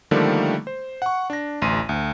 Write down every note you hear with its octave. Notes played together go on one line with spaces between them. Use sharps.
D3 D#3 F3 G3 A3 A#3
C5
F#5 C#6
D4 A#6
A1 D2 C6 D#7
D2